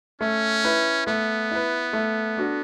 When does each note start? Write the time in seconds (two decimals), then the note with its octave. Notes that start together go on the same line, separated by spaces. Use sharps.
0.21 A3 C#4
0.65 E4 B4
1.07 A3 B3
1.51 E4 B4
1.93 A3
2.37 D4 F#4 A4